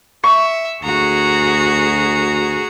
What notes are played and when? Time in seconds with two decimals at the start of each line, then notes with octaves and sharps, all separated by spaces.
0.24 E5 C#6
0.84 D2 F#4 G#4 A#5